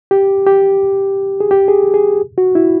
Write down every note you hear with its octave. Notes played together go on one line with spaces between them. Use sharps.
G4
G4
G#4
G4
G#4
G#4
F#4
E4